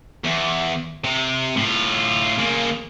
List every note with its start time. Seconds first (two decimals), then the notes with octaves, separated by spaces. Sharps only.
0.24 E2
1.04 C3
1.57 A2 F4
2.38 C#3 A#3